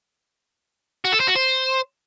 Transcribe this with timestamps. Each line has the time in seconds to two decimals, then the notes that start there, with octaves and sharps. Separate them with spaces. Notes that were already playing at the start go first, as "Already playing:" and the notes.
1.05 F#4
1.12 A4
1.20 C5
1.28 F#4
1.36 C5